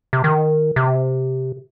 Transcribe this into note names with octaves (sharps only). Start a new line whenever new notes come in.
C3
D#3
C3